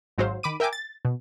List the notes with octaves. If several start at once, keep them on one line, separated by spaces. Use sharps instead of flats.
G#1 G#2 F#3 G#3 C5 F5
D#3 B5 D6 D#7
A#4 E5 G5 G#5 D6
A6
B2